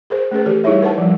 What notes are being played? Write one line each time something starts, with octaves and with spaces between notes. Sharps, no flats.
G#4 A#4 C5
A3 C#4 G#4 B4
E3 G4 A4
G3 D#4 E4 G#4 C#5 E5
A#4 B4 F#5 A5
F3 G3